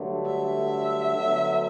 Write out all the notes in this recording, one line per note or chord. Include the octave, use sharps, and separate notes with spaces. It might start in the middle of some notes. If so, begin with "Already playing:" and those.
Already playing: G2 D3 F#3 A3
E5
D2 D3 F#3 B3